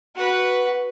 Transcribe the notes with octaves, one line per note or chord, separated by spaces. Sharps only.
F#4 B4